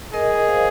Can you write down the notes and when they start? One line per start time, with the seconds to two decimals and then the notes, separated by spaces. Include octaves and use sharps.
0.13 G#4 A#4 D#5
0.48 C5 F5